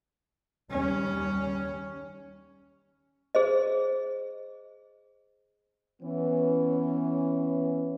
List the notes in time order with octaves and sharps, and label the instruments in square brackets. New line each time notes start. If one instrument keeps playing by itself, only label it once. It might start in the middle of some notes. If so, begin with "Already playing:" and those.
[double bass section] D#2 G3 [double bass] C#4
[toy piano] G#4 C5 D#5
[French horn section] E3 B3 C#4